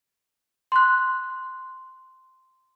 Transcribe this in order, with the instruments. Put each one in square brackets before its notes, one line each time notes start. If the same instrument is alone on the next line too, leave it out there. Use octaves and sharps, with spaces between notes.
[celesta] C6 F#6